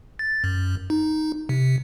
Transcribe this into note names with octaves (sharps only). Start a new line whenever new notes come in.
A6
F#2
D#4
C3